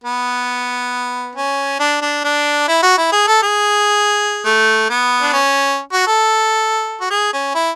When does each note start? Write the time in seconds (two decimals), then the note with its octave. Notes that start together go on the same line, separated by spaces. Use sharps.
0.04 B3
1.36 C#4
1.80 D4
2.02 D4
2.25 D4
2.68 E4
2.83 F#4
2.98 E4
3.12 G#4
3.28 A4
3.43 G#4
4.45 A3
4.90 B3
5.22 D4
5.33 C#4
5.93 F#4
6.08 A4
7.01 F#4
7.10 G#4
7.33 C#4
7.55 E4